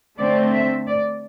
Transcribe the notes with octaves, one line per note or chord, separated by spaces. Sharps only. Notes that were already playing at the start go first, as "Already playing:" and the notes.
D3 A3 C4 D5
E5
D5